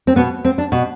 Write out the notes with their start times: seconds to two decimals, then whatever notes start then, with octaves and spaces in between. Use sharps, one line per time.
0.07 C4
0.16 B2 B3
0.45 C4
0.58 D4
0.72 B2